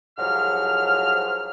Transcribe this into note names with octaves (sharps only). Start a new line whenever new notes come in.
C2 G#2 F3 F#3 F6